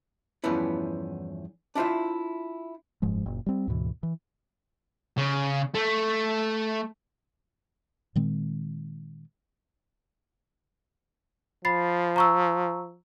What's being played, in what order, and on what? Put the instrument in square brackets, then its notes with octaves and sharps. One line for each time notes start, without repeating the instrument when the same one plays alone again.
[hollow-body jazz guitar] E2 G2 F3 B3 C#4 E4
D4 E4 F4 C5 E5
[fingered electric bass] F#1 G#2 F3 G#3
F#1 A#2
G3 C4
D2 G#2 B2 E3
E3
[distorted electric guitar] C#3
A3
[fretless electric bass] A#2 D#3 G#3 C4
[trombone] F3 [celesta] B5 A6 C7
[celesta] A#5 C#6 E6